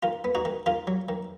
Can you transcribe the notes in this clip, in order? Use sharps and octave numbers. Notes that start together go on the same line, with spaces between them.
D#3 F4
B3
D#4 F#4
D#3
D#3 F4
F#3
D#3